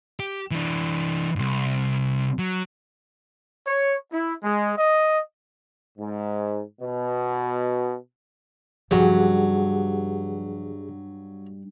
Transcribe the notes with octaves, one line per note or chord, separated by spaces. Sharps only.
G4
E3 D4
C2 G#2
F#3
C#5
E4
G#3
D#5
G#2
B2
G2 C#3 F3 F#3 G4 G#4 F#5